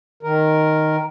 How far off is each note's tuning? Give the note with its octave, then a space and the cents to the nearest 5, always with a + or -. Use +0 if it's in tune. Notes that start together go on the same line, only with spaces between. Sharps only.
D#3 +0 A#4 +0